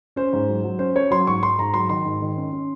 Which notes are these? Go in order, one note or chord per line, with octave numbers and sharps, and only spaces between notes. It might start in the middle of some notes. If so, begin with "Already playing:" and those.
C#4 C5
G#2
F#3
F#3
C#4 C5
C#4 C#5
F#3 C6
G#2 C#6
G#2 C6
G#2 A#5
F#3 C6
D#3 C6
G#2
D#3
C#4
C#4